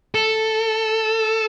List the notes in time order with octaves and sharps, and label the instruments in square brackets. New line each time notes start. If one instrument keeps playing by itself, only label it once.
[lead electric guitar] A4